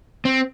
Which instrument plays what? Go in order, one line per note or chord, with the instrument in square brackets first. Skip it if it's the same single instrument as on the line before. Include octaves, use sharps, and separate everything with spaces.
[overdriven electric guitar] C4